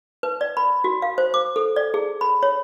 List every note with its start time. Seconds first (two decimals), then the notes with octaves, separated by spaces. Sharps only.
0.23 B4
0.41 D5
0.57 B5
0.84 F#4
1.02 F5
1.18 C5
1.34 D6
1.56 A4
1.76 D5
1.94 G#4
2.21 B5
2.43 C#5